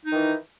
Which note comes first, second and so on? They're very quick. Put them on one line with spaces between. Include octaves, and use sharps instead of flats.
D#4 D#3 E3